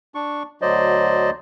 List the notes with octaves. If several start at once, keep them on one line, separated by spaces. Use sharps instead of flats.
D4 C#6
D2 F#3 C5 D5 D#5